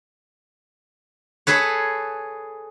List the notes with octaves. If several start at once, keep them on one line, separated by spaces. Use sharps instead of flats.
G#4 A4 B4 C#5